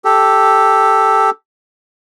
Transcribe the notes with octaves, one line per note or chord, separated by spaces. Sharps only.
G4 A4